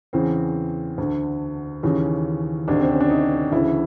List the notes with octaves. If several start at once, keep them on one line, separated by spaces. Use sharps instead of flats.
E2 C#3 E3 C4
D2 D3
D#2 C#3 E3 C#4
D2 C3 D#3 D4
C4
C#4
D4
D#4
D2 C#3 E3 E4